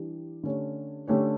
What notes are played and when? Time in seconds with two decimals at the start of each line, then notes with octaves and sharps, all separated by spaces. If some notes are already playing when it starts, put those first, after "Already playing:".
Already playing: E3 G3 D4 G4
0.43 D3 A3 C#4 G4 C#5
1.08 D3 A3 C#4 G4 C#5